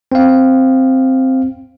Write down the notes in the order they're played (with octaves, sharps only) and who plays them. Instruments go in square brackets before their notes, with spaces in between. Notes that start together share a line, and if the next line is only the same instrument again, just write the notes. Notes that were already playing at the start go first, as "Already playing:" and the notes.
[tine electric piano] C4 F5